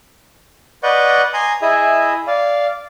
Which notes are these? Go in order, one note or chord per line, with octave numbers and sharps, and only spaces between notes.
B4 D5 D#5 F#5 C#6 G6
G#5 A#5 C6 D#6
E4 G#4 D#5 E5
D5 F5